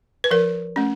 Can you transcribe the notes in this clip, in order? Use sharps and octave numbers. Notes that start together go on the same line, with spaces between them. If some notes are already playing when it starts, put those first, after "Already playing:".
B4
F3 A#4
A3 C#4